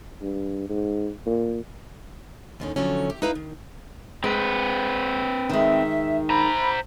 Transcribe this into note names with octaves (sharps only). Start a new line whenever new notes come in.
G2
G#2
A#2
D#2 A2 D3 D#3 C#4
D3 F3 F#3 A3 C#4
G4
D#4 E4 B4 E5 F5 A#5
D#3
G#3 C4 B4
D#3 G#3 E5
C5 A#5 B5